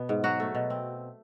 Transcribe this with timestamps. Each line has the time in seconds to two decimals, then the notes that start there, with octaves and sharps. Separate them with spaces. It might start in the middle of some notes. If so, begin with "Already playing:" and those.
Already playing: B2 B3
0.09 G#2
0.24 F#3 F#4
0.40 A3
0.55 B2
0.70 C4